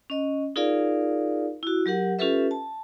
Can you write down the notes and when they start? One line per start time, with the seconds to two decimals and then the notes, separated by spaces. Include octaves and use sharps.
0.10 C#4 D#5
0.56 D#4 F4 G#4 A#4 D5 F5
1.63 E4 F#4
1.86 F#3 G4 A#4 F#5
2.19 C#4 F4 G4 A4 B4 E5
2.51 A5